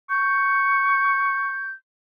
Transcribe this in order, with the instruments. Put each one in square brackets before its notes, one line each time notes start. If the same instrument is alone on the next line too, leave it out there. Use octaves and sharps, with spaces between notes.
[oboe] C#6 [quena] G6